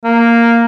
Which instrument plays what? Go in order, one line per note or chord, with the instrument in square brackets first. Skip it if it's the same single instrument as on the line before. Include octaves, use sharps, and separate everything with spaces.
[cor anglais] A#3